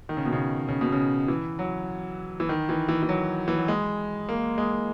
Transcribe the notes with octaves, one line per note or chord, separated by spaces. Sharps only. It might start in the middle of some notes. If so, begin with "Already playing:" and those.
D#3
C#3
B2
C#3
C#3
B2
C#3
E3
F#3
E3
D#3
E3
E3
E3
F#3
E3
F#3
G#3
A#3
G#3